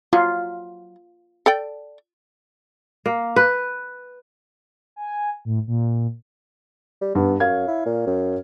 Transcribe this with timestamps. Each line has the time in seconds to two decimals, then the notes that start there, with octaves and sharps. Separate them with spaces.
0.13 F#3 F4
1.46 A4 D5 G5
3.06 A#3
3.36 B4
4.96 G#5
5.45 A2
5.67 A#2
7.01 G3
7.15 G2 B3
7.40 F#2 C#5 F5 G#6
7.68 E4
7.86 A#2
8.06 F#2